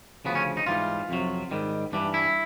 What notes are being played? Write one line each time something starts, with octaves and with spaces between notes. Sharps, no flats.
D2 C#3 F3 B3
C#4
D#4
G#2 E3 G3 F4
F2 C3 D#3 F#3
G#2 D#3 G3
G2 E3 G3 D4
E4